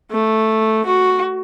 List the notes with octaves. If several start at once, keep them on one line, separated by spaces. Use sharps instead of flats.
A3
F#4